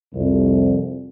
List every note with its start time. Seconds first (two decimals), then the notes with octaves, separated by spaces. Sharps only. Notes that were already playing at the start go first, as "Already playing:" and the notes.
0.14 C2 F2